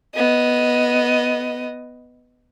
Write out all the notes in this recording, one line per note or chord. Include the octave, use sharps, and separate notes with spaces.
B3 D#5